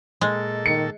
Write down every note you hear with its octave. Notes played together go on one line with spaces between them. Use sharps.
A#2 G#3 A4
D#3 C#7